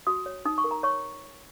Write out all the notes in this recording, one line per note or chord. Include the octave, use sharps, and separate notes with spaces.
F#4 D#6
C#5
D#4 D#6
C#6
A#4
A#5
C#5 C#6